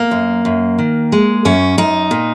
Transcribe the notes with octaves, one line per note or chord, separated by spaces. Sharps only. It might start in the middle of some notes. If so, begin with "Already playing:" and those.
Already playing: A#3
F#2
F#2
D#3
G#3
F#2 C#4
F#2 D#4
A#2